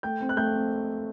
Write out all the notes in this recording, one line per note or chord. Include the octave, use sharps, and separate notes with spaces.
A3 G5 G6
C4
F#6
A3 G5 G6
C4